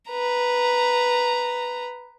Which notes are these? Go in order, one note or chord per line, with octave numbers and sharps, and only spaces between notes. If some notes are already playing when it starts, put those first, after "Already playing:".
B4 A#5